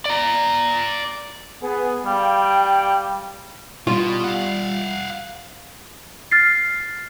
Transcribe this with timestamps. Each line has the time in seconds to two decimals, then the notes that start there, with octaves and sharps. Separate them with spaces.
0.06 D5 A#5
1.63 B3 G#4
2.06 G3 F5 G5
3.87 B2 G3 F4
4.24 F5 F#5
6.31 F6 A6 C7